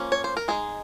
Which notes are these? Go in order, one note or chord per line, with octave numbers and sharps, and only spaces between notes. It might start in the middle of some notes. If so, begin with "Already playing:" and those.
Already playing: F3 A#3 C#4
C#5
C5
A#4
G#3 D#4 G#4